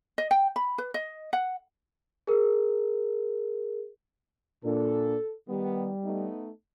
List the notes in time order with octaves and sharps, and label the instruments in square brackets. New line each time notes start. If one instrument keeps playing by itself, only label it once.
[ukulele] D#5
G5
B5
B4
D#5
F#5
[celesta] G#4 A#4
[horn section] A#2 D4 [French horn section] A4
[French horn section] D#3 B3 [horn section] G3
[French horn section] A3 B3 D#4